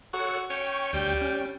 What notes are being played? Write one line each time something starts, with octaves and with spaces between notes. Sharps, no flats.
F#4 A4 C#5 F#5
C#4 G5 C#6
D2 G3 G5 G6
C#4 G5